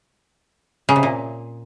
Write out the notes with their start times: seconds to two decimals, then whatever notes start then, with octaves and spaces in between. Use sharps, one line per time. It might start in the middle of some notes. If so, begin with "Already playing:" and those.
0.89 C#3
0.96 C3
1.03 A#2